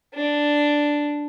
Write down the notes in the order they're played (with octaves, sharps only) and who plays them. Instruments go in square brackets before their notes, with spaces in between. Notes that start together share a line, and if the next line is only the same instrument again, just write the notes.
[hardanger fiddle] D4